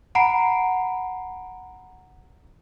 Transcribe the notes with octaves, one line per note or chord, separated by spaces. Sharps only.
F#5 A#5 B5 C7 D7